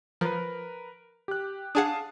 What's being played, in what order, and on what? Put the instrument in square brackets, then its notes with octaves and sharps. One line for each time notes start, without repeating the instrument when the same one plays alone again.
[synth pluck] F3 [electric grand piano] A#4 B4
[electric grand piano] G4 F#6
[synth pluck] D4 G#4 F#5 [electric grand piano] F5 A5 D#6